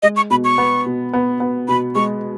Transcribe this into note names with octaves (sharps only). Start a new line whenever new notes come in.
G#3 D#5
C#6
B2 B5
C#6
B3
B2
B3
B3
B2 B5
G#3 C#6